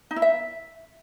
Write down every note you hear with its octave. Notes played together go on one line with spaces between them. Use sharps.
D#4
E4
E5